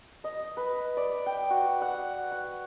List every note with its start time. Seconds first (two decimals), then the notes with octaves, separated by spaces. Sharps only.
0.24 D#5
0.57 B4
0.97 D5
1.26 G5
1.50 F#4
1.82 F#5
2.31 F#5